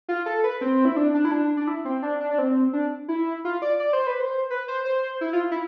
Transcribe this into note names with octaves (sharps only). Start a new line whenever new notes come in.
F4
A4
B4
C4
E4
D4
D4
E4
D4
D4
E4
C4
D4
D4
D4
C4
D4
E4
F4
D5
D5
C5
B4
C5
B4
C5
C5
E4
F4
E4